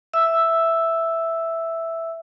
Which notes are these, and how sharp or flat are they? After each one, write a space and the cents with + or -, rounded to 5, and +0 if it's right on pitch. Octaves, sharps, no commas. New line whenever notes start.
E5 +0 E6 +0